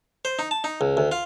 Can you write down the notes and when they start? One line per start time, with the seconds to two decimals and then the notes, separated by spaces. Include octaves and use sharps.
0.25 C5
0.39 D#4
0.51 A5
0.64 D#4
0.81 C#2
0.97 D2
1.12 F4